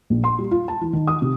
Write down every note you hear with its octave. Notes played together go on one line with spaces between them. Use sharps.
A#1
C6
G3
F4
A5
E3
D#3
D#6
C3